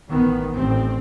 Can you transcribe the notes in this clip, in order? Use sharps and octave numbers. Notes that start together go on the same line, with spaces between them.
A1 A2 D#3 B3
A1 C4